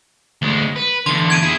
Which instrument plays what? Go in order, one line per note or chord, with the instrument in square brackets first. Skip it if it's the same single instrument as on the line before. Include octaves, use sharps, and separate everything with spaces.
[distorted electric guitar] D2 G#3
B4
[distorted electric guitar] E2 D3 [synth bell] C6
[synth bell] G#6 D7 D#7
[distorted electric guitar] E4 G#4